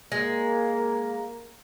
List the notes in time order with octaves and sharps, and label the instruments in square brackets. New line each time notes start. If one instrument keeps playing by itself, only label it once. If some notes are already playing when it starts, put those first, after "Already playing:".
[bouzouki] G#3 [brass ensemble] A#3